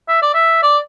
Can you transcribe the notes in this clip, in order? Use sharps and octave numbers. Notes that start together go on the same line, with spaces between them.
E5
D5
E5
D5